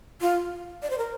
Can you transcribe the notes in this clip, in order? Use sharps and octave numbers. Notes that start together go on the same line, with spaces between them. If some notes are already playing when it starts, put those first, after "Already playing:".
F4
D5
C5
A#4